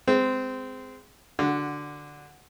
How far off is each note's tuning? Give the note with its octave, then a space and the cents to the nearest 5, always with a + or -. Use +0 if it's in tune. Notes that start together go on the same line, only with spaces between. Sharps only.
G#3 +0 C4 -20
D3 +0 F#4 +0